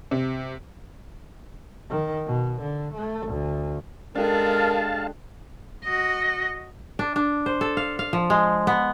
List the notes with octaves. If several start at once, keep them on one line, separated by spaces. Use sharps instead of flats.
C3
D#3
B2
D3
A3
D2
G#3 D4 G4 A4 A#4 F5 A5
F#4 D#5
D4
D4
C5
A4
F5
F5
F3
G#3
B3